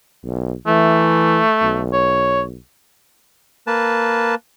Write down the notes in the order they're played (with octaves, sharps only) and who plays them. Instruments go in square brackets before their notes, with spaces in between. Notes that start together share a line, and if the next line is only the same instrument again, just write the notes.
[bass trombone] B1
[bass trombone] E3 [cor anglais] A3
[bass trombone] B1
[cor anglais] C#5
[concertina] A#3 B4 A5